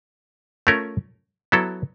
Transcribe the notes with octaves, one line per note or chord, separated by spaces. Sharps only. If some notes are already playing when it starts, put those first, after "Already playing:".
A3 C#4 F4 A#4
F#3 B3 E4 A4